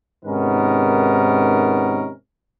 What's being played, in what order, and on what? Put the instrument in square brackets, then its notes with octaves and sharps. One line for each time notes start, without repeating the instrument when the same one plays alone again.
[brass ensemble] G#2 C3 D#3 B3 C#4 A#4